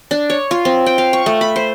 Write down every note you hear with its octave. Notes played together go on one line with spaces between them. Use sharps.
D4
C#5
F4
C4
G5
F5
C#6
A3
B5
C5